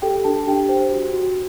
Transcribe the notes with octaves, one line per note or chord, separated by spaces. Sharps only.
G4 A4 G5
D4 A4 A5
D4 G4 G5
C5
F#4
F#4